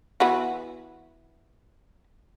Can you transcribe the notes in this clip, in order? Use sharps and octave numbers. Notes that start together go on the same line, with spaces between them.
E3 B3 F#4